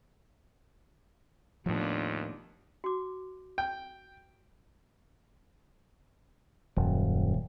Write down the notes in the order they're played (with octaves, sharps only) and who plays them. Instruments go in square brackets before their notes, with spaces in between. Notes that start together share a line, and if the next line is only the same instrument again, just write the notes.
[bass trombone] D#2 [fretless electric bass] A2 F3 [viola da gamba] B3 D4 F4
[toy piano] F#4 D6
[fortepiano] G5
[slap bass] D#1 [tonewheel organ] F#2